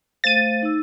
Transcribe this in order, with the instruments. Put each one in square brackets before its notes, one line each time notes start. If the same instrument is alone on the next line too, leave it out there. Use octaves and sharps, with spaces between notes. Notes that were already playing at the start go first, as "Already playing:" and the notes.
[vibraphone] A3 C5 F5 [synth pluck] A6 D#7
[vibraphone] D#4 E6